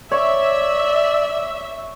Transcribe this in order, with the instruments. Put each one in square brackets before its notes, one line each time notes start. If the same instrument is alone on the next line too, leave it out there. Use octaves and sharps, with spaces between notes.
[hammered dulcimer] C#5 [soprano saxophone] D5 [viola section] E5